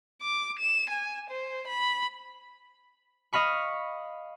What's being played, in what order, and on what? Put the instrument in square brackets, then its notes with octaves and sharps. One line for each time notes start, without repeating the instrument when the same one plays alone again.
[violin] D6
E7
G#5
C5
B5
[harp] D#5 F5 B5 C#6